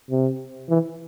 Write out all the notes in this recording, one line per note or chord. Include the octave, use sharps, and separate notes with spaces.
C3
E3